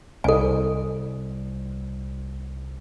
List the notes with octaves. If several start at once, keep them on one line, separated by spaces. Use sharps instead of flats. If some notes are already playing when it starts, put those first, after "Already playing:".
C2 A4 G#5